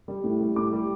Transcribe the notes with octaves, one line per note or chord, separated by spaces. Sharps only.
G3
A2
G3
A2 D6
G3